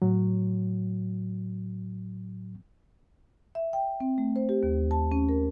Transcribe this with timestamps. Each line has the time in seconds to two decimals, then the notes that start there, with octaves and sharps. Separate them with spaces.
0.02 A2 F#3
3.55 E5
3.73 G5
4.00 C4
4.18 A3
4.36 C5
4.49 G4
4.63 D#2
4.91 A5
5.12 C#4
5.29 A#4